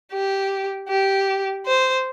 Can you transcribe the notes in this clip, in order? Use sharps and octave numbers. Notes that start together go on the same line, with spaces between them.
G4
G4
C5